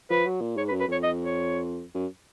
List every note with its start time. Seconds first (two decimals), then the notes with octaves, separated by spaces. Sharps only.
0.10 F3 B4
0.25 F#3
0.41 A#2
0.57 G#2 C#5
0.68 B4
0.72 F#2
0.80 B4
0.88 F2 C#5
1.03 D#5
1.25 C#5
1.95 F#2